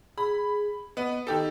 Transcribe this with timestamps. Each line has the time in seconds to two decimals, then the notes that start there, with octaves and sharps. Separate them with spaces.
0.18 G#4 B5
0.97 B3 D#5
1.27 D#3 G4 A4